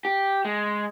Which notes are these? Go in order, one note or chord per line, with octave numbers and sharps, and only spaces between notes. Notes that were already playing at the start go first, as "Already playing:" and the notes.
G4
G#3